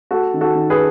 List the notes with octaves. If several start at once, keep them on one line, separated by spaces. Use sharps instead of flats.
A3 F#4 A4
D#3
F#4 A4
D#3
G#4 B4